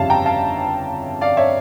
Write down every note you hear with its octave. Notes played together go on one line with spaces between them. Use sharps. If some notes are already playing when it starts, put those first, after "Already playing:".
Already playing: G1 F2 C#3 G3 C#5 E5 F5 A5
G5 A#5
F5 A5
D5 F5
C#5 E5